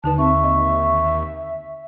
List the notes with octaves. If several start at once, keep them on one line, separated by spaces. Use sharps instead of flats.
D#2 D3 D#4 B4 A5
C4 E5 C#6
D#5